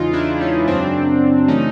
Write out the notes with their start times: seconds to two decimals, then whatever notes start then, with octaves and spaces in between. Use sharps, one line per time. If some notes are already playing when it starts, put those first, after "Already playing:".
Already playing: E2 C#3 E3 G#3 D#4 F4
0.13 D4 E4
0.41 C#4 D#4
0.68 F#2 C#3 F#3 C4 D4
1.48 C#3 E3 A3 C#4 D#4